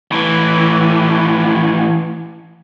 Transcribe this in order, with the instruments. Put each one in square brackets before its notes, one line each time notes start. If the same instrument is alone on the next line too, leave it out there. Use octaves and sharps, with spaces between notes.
[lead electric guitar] A2 E3